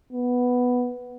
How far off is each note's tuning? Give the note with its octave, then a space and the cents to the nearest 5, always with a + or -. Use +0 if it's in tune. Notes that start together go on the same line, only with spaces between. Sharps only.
B3 +0